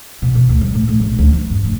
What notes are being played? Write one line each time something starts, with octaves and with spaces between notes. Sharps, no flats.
B2
B2
D2
G3
A2
A2
A#1
D2
E3
G2
F1